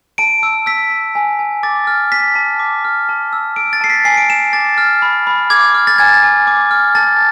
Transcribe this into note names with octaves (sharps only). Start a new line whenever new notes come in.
A5 D7
E6
E6 B6
A5
G#5
G#5
D6 A6
F6
A5 B6
A5
D6
F6
A5
E6
E6 D7
A6
A5 C7
B6
G#5 C7
D7
G#5 E7
D6 A6
F6
B5
B5
D6 G#6
F6
A6
G#5 G#6
G#5
D6
F6
A5 A6